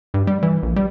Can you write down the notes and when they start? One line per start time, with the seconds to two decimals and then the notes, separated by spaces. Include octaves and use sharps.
0.14 G2
0.27 G3
0.43 E3
0.63 A#1
0.76 G3